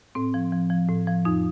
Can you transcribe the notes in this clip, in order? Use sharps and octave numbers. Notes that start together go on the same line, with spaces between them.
A2 C4
F3
F3
F3
A2
F3
F2 D#4